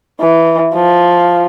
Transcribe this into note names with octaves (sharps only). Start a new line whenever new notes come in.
E3
F3